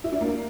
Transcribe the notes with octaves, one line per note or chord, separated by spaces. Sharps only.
E4
D4
A#3